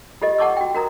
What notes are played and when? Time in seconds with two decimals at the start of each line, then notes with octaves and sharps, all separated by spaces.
0.22 F4 G4 A4 D#5
0.38 F#5 A5 C#6 D6 E6
0.57 F#4 G5
0.74 F#4 A#4 A#5 D#6